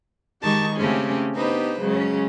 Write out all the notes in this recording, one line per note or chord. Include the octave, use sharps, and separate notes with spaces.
D#3 G#3 D#4 G4 A5 C#6
C#3 A3 C4 C#4 G4 G#4
B3 D4 D#4 G4 B4 C5
C#3 F#3 G#3 C#4